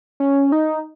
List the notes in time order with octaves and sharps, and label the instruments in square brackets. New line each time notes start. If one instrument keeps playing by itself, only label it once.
[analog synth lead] C#4
D#4